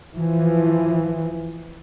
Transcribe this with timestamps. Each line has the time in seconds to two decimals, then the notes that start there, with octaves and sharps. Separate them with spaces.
0.16 E3 F3